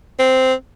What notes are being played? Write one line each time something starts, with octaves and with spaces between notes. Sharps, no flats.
C4